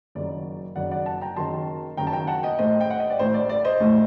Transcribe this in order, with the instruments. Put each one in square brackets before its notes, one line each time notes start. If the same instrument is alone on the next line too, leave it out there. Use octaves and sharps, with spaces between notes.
[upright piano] F#1 F#2 D#3 F#3 D5
F#1 F#2 D#3 F#3 D5 F#5
D5 F#5
F#5 A5
G5 A#5
F#1 F#2 D#3 F#3 A5 C6
F#1 F#2 D#3 F#3 G5 A#5
A5
G5 A#5
F#5 A5
D#5 G5
A1 A2 A3 C5 D#5
G5
F#5
D#5
D5
A1 A2 A3 C5
D5
D5
C5 D#5
A1 A2 A3